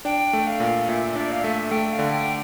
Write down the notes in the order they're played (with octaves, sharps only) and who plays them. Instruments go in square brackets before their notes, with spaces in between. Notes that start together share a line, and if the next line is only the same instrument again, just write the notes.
[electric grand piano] D4 [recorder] G5
[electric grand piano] A3
[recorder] F5
[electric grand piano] A#2
[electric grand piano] A#2 [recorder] E5
[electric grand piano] D4 [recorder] D5
[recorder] F5
[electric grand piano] A3 [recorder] E5
[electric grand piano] A3 [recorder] G5
[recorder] F5
[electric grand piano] D3
[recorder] G5